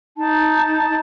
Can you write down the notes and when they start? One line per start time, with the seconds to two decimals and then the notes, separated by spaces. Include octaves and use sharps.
0.17 D#4 A5